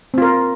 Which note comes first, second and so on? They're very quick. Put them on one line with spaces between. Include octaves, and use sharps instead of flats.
C4 F4 A#4